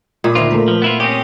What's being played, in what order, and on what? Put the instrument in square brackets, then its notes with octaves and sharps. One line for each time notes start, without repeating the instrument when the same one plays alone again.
[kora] A#2 [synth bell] B5 D#6
[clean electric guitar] D2 D#3 F4 [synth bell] A#4 C5 E5
[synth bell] A3 A#3 B4
[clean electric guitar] F3
B3 E4 F4
[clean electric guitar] C4 C#4 G4 [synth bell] C#5 D#6